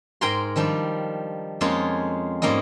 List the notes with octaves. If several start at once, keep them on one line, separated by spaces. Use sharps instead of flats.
G#2 A#4 G5 G#5 A#5 C6
D#3 F3 G3 D4
F2 G#3 A#3 C#4 F4 G#4
G#2 G3 A#3 C#4 D#5